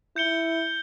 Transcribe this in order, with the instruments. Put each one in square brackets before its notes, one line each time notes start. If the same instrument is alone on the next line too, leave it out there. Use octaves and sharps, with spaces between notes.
[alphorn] E4 [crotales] G6 C#7 G7